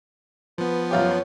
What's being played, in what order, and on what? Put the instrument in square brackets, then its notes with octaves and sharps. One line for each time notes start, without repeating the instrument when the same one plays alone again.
[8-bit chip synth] F3 B3 [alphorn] B4
[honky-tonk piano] F#2 F4 G4 [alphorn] C#5